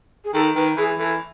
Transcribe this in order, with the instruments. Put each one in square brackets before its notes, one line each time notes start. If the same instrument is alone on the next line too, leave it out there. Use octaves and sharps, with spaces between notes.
[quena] G#4
[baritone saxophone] D#3 [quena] A4
[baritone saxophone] D#3 [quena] B4
[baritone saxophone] E3 [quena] G#4
[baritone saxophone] E3 [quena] A4